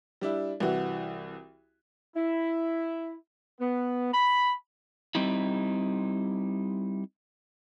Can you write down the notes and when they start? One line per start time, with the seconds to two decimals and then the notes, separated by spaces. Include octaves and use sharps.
0.21 G3 D4 E4
0.60 C2 E3 F#4
2.16 E4
3.61 B3
4.14 B5
5.15 G3 C4 D#4 E4